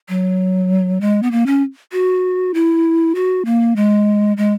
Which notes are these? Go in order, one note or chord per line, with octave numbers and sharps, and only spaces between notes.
F#3
G#3
B3
A#3
C#4
F#4
E4
F#4
A#3
G#3
G#3